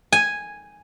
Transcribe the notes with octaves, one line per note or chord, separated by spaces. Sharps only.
G#5